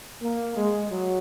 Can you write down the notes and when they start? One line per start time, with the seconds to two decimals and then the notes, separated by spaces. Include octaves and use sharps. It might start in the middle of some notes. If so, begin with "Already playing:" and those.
0.22 A#3
0.56 G#3
0.90 F#3